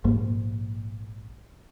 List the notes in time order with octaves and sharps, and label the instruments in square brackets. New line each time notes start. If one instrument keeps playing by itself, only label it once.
[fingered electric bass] A#1 G#2 A#3